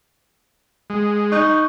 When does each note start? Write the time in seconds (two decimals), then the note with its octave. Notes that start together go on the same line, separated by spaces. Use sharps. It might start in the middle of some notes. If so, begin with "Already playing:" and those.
0.90 G#3
1.32 D#4 C#6 F#6 G6